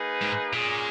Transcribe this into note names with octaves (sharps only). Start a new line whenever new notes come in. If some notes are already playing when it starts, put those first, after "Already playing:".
Already playing: A#3 D#4 G#4 B4
G#2
A#2 G#3 C#4 G#4